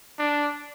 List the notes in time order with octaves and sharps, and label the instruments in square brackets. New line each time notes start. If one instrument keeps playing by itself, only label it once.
[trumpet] D4